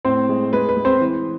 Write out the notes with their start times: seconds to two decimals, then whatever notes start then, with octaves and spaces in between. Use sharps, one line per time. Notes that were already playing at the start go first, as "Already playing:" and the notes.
0.05 A2 C4 C5
0.29 G#3
0.53 G#3 B4
0.69 B4
0.77 G#3
0.85 C4 C5
1.01 E3